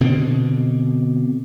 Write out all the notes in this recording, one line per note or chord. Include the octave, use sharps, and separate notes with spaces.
B2 D3 C4